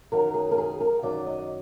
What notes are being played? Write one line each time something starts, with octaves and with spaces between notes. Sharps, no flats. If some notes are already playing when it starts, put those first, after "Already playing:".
F#2 D#3 F#3 A#4
G#4
A#4
G#4
A#4
F#2 D#3 F#3 D5
D#5